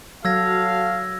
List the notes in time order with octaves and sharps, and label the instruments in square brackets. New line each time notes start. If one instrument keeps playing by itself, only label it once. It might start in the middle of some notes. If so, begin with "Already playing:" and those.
[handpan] F#3 [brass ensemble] F#4 A4 F5 [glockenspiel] E6 G#6 A#6